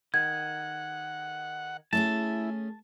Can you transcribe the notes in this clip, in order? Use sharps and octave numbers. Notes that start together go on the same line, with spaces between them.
D#3 F#5 G#6
A3 C#4 E4 G#4 A5